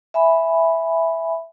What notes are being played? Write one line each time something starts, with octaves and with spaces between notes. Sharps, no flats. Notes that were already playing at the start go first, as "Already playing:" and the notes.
E5 G#5 B5